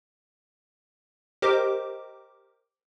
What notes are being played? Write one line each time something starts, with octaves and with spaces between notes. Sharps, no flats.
G4 A#4 C5 D#5 D6